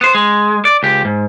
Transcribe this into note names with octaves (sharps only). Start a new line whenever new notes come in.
B3 C5
G#3
D5
C#2 G4
G#2